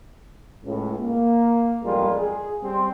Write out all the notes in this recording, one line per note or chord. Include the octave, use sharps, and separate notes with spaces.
C#2 A2
A#3
A1 F2 G3 G#3 F4 A#4
G#4
G3 C4 C5